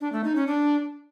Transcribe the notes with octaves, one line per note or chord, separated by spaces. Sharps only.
D4
A3
D#4
C#4
D4